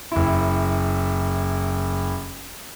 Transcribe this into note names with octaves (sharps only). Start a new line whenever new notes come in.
F#1 E4